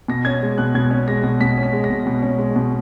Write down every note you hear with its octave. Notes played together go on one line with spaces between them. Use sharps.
B2 A#6
C#4 G#6
G#3
B2 F#6
B2 G#6
C#4
G#3 A#6
B2
B2 B6
C#4
B6
G#3
A#6
B2
B2
C#4
G#3
B2